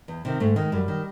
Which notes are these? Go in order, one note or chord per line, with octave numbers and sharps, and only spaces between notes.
E2
C3 D#3
G#2 A3
D#3 G#3
F#2 G3
D#3